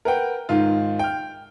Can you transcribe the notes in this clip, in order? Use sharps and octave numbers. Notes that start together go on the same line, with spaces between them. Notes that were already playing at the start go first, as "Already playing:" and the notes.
A#4 B4 F#5 G5
G#2 D#3 F4
G5 F6